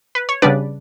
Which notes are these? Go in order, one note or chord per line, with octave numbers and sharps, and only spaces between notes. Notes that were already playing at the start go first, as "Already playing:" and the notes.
B4
C#5
C#3 G3 B3 D4 B4 D5